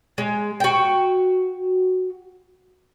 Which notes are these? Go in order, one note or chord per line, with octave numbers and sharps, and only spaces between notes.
G#3
F#4 G5